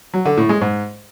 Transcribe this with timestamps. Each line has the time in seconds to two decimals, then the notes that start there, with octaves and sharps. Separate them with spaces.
0.14 F#3
0.25 D3
0.37 A2
0.49 G#3
0.61 G#2